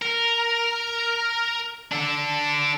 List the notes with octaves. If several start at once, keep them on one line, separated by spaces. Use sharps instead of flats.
A#4
D4 A4